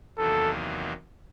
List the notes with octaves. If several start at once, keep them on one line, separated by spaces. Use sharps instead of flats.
E2 C3 D#3 F#3 A#3 A4